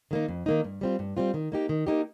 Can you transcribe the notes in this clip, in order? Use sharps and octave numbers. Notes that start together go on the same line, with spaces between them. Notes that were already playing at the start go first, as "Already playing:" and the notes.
D#3 A#3 D#4
F2
D#3 A#3 D#4
G2
G3 C4 F4
G2
G3 C4 F4
D#3
A#3 D#4 G4
D#3
A#3 D#4 G4